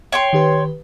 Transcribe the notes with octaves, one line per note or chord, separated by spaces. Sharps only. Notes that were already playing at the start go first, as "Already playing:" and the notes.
C#5 G5 C6
D#3 G4 B4